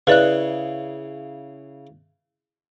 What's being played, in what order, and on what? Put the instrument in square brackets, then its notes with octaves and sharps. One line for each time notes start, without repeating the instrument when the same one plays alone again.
[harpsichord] C#3 E4 [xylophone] B4 D5 F#6